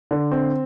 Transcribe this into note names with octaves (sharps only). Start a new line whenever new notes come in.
D3
C4